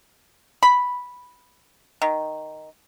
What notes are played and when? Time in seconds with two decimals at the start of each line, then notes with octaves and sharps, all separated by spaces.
0.63 B5
2.02 D#3